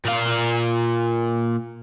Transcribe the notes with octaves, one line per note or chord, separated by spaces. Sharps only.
A#2 F5